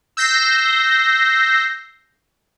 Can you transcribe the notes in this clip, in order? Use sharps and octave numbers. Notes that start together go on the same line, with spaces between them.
E6 G6 A#6 C7